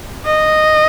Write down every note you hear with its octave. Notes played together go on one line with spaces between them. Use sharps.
D#5